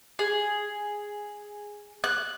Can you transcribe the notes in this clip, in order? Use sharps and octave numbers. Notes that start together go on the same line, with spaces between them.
G#4
F#6